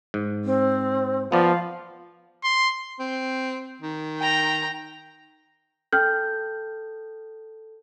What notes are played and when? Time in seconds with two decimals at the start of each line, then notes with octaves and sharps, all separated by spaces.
0.14 G#2
0.45 C4
1.32 F3 B3 D5 F5
2.44 C6
2.99 C4
3.82 D#3
4.18 G5 A#5
5.93 A4 G5 F6 G6